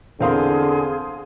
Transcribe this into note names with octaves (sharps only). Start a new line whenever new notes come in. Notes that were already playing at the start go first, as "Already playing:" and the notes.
E2 D3 C4 G#4 A#4 F5 C6 D#6